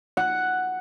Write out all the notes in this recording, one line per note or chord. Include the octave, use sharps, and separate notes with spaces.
F#5